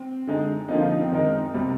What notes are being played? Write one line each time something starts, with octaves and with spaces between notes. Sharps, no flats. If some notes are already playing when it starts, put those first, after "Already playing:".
Already playing: C4
D3 G#3 D#4
D3 F3 A#3 C4 D#4
F4
D#4
C4
D#3 G#3 D#4 A#4
C3 G3 C4